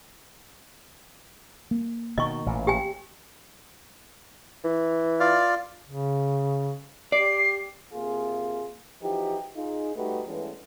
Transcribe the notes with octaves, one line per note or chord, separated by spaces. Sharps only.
A#3
B2 D#3 D#5 C#6
A1 A#2
G4 G5 G#5
E3
F4 D5 F5
C#3
G4 D5 C7
C3 A#3 F4 G#4
E3 F3 D#4 F#4 G4
D#4 F4 G#4
G3 A3 D#4 F#4 G4 B4
G2 E3 G#3 A3 B3 C#4